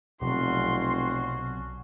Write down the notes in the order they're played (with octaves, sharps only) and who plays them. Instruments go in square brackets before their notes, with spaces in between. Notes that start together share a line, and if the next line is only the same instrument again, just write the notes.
[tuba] F1 [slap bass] B1 C3 F#3 [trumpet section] C#4 D4 F#4 [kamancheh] C6